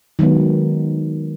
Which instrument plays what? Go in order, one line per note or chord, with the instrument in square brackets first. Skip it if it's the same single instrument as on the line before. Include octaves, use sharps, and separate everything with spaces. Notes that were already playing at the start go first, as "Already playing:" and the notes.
[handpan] D#3 F#3 G#3 B3